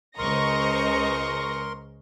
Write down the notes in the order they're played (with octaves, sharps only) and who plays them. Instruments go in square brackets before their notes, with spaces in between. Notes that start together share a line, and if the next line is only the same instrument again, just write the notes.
[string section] C#2 C#6 A#6 [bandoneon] A#4 C6 [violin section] C5 D#5 A#5